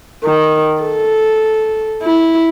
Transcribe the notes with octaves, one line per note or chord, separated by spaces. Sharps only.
D#3
A4
E4